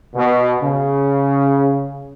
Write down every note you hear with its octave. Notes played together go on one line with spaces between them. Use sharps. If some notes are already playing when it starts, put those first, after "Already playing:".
B2
C#3